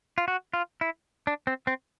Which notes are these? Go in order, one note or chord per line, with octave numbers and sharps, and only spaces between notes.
F4
F#4
F4
E4
D4
C4
C4